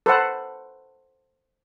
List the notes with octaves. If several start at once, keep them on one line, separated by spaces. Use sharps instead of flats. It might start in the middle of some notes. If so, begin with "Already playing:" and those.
A4 B4 C5 F#5